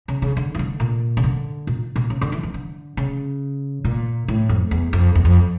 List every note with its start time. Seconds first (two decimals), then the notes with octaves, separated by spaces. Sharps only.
0.08 C#3
0.22 C#3
0.37 D3
0.54 E3
0.59 D3
0.80 A#2
1.17 C#3
1.24 D3
1.67 A#2
1.96 A#2
2.10 C#3
2.21 D3
2.32 E3
2.43 E3
2.54 D3
2.97 C#3
3.84 A#2
4.28 A2
4.49 F2
4.71 E2
4.93 F2
5.15 E2
5.25 F2